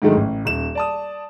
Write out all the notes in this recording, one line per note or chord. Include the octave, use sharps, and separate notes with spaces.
G#2 D3 D#3 F#3 G#3 A3
A1
D#1 E7
D5 A5 D#6